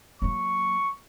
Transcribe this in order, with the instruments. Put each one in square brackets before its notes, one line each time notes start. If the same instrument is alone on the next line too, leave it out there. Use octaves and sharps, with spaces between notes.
[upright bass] F#3 A#3 [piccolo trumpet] C#6